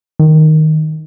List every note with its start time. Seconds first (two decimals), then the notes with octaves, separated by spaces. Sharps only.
0.19 D#3